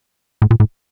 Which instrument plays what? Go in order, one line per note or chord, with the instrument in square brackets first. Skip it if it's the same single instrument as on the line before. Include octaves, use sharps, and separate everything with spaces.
[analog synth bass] A2
A#2
A2